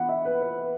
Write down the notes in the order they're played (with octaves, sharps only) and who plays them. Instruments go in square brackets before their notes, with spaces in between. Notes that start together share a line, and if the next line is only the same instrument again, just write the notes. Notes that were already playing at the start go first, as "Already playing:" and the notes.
Already playing: [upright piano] E3 B3 F#5 B5
E5
B4
B4